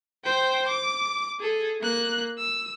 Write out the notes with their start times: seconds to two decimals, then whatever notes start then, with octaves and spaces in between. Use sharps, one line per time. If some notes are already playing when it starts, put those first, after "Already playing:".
0.24 C5 G5
0.67 D6
1.40 G#4 A4
1.81 A#3 F#6
2.38 E6